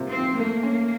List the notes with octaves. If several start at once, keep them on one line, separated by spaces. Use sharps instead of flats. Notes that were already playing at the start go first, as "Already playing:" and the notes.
Already playing: C3 A#3 F4
C4
F3
A3 A#3
C#4